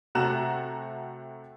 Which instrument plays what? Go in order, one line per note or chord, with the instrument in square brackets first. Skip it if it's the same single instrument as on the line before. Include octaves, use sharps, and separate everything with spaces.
[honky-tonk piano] C3 A3 F#4 A#5 F#6 E7